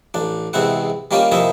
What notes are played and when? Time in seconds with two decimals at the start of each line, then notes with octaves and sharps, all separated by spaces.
0.14 A1 D4
0.53 E2 G#2 C3 C4 E4 F#5
1.11 D#3 G3 A#3 C#4 F4 G4
1.32 C3 F3 A#3 D#4 E4 E5